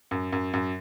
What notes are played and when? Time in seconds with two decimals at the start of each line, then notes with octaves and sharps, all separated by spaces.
0.11 F#2
0.32 F#2
0.54 F#2